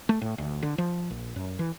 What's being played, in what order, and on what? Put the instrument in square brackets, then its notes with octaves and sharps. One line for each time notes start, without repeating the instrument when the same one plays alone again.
[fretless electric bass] A3
A2
D2
D3
F3
A#1
F#2
E3